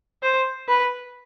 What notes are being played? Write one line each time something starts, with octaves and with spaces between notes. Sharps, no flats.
C5
B4